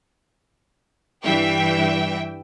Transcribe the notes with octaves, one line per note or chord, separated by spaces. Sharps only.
G2 E3 E5 G5